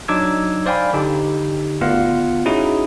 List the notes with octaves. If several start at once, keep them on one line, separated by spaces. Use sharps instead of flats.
F#3 D4 D#4 D6 E6 G#6
C5 D5 F5 G5 G#5 B5
D3 D#4 G4
G#1 D2 B3 F4 F5 F#5
C#4 D#4 E4 F#4 G#4